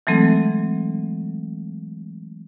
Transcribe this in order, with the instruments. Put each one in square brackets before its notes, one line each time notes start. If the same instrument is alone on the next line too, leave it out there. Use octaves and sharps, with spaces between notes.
[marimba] E3 F#3 G#3 A3 C4 A4